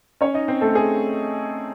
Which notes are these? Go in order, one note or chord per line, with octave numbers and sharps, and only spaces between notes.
C#4 C#5
D#4 D#5
C4 C5
A3 A4
G#4